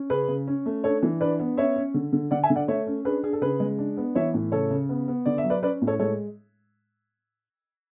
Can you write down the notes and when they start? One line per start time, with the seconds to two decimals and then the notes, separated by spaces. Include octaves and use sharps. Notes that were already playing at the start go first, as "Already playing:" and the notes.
Already playing: C#4
0.10 C#3 G#4 B4
0.28 C#3
0.47 C#4
0.66 A3
0.84 D4 A4 C#5
1.03 E3
1.21 D4 B4 D5
1.39 B3
1.57 C#4 C#5 E5
1.76 C#4
1.94 D3
2.13 D3
2.31 D3 D5 F#5
2.43 E5 G#5
2.50 D3
2.56 D5 F#5
2.68 A3 C#5 E5
2.87 C#4
3.05 D4 G#4 B4
3.23 D4 G#4
3.33 A4
3.42 C#3 G#4 B4
3.60 G#3
3.78 D4
3.97 B3
4.15 E3 C#5 E5
4.34 A2
4.52 C#3 A4 C#5
4.70 C#3
4.89 B3
5.08 B3
5.26 D3 D5
5.38 E5
5.44 F#3
5.50 B4 D5
5.62 C#4 B4 D5
5.82 A2
5.87 A4 C#5
6.00 G#3 A4 C#5